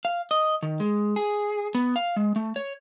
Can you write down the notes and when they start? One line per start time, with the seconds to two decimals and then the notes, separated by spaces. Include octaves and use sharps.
0.05 F5
0.31 D#5
0.63 D#3
0.80 G#3
1.16 G#4
1.75 B3
1.96 F5
2.16 G#3
2.36 A3
2.56 C#5